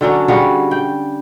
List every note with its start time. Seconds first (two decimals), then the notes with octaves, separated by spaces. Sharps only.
0.01 D3 F#3 C#4 D4
0.28 G3 F#4 G#4 F5
0.71 G5